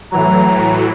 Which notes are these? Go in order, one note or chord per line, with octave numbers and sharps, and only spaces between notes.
A2 E3 F#3 A#5